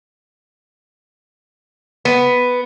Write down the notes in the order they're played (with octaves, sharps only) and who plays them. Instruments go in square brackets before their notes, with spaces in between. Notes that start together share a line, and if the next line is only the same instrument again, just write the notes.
[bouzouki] B3